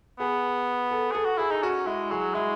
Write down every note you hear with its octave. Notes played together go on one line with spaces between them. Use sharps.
B3 G#4
A4
G#4 A4
F#4
E4 G#4
D#4
C#4 F#4
G#3 E4
F#3 G#4
G#3 E4